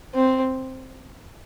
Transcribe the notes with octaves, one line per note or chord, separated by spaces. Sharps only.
C4